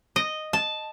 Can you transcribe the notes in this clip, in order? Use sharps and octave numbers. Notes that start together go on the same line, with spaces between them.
D#5
A5